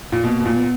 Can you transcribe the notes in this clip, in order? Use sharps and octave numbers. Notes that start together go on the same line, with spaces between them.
A#2
B2 A#3
B2
A#2 A#3
B3